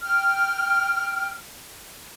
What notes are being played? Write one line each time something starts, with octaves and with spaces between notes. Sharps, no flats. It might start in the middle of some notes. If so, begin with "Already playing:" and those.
G5 F6